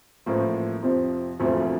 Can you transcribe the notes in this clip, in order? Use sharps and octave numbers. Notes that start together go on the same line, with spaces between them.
A1 A2 F3 A#3
F2 C3 F3
E1 D2 C3 F3 A3